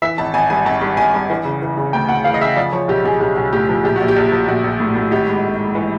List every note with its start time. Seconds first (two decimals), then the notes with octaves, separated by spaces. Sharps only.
0.02 E3 E5
0.18 G#1 A5
0.34 G#1 G#5
0.50 G2 G#5
0.65 G#1 A5
0.81 G2
0.97 G#1 G#5
1.14 G2
1.30 E3
1.45 C#3
1.62 E3
1.77 C#3
1.93 D2 G5
2.09 D2 F#5
2.24 E3 F5
2.34 D#5
2.41 C#3 E5
2.57 F3 D5
2.73 F3 C#5
2.88 B1 G4
3.04 B1 G#4
3.20 B1 G4
3.36 B1
3.53 A2 G4
3.69 F3
3.84 A#1 G4
3.96 A#1 F#4
4.08 G4
4.16 A#1
4.32 F3
4.48 A#1 F#4
4.64 A#1
4.80 A2
4.95 A2
5.11 G#1 G4
5.27 G#2
5.44 G#1
5.59 G#2
5.75 E3